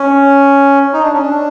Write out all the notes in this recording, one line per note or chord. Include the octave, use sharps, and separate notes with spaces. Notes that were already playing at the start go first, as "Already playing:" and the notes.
Already playing: C#4
D#4
D4
C#4
D4